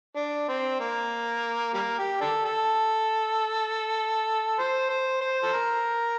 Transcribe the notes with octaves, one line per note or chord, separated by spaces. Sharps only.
D4
C4
A#3
G3 A#3
G4
D4 A4
A4
C5
C5
C5
A4
A#4